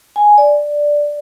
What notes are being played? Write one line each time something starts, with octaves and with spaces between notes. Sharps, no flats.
G#5
D5